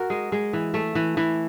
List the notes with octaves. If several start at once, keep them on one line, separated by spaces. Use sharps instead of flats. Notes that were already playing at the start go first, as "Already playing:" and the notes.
Already playing: F#4 A#4
G#3
G#3
E3
A3
E3
E3